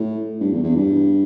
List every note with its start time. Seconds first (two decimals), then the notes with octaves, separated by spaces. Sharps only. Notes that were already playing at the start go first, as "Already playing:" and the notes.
Already playing: A2
0.41 G2
0.52 E2
0.63 E2
0.76 G2